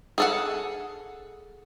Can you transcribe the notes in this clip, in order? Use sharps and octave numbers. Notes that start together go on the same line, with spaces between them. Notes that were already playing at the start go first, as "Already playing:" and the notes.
G#4 A4 F#5